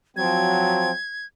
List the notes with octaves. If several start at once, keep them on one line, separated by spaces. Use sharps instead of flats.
F3 F#3 C4 G#6